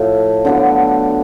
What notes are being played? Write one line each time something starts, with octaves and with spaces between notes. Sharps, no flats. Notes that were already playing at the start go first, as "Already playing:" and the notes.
Already playing: A2 F3 A3
D3 F#3 B3 D4